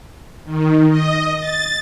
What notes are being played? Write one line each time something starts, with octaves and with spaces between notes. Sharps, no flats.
D#3
D#5
A6